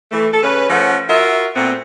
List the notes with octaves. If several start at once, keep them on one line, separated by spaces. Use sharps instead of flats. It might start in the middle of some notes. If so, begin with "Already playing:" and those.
E3 A3
A4
C#3 C#4 B4
F3 A3 C#4 F#5
F4 F#4 A#4 E5
A#2 A3 B3 C4